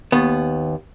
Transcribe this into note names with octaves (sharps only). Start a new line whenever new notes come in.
D#2 B3